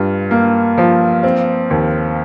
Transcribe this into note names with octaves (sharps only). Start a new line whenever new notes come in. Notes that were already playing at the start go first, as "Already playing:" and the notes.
Already playing: G2 F4
A#3
F3
C4
D#2